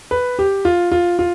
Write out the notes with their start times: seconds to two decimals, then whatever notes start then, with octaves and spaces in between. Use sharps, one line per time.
0.11 B4
0.39 G4
0.65 F4
0.92 F4
1.19 F4